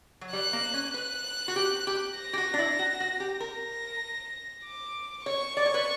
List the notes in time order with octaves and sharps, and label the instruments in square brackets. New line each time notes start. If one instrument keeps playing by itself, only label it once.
[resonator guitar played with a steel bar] F#3
[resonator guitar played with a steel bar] G3 [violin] F#6
[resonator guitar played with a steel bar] A#3
C#4
[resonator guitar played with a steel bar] B4 [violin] F#6
[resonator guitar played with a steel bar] F#4
G4
G4
[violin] A#6
[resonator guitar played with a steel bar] G4
F#4
D4
E4
F#4
F#4
G4
[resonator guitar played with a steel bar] A#4 [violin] A#6
[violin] D6
[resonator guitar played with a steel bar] C#5 [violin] C#6
[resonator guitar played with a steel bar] D5
C#5
B4